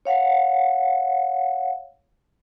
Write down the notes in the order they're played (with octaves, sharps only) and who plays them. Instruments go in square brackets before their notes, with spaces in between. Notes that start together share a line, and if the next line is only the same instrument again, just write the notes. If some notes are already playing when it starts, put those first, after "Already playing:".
[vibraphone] C#5 F5 F#5